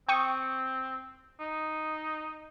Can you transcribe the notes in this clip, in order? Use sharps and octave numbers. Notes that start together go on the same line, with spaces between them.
C4 G5 C#6 D#6
D#4